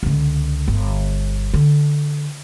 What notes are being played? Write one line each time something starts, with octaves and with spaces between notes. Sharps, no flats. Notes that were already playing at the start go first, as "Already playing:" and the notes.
C#2 D3
G1
D3